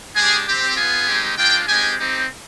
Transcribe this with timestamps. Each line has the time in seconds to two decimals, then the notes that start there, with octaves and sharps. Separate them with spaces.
0.16 G#3 D4 G4 G#4
0.46 C4 G4
0.76 B3 F4 G#4
1.07 G#3 C4 D#4 G4
1.37 G#3 D4 F4 G5
1.67 G#3 C4 D#4 G4 G#5
1.98 C4 D#4 G4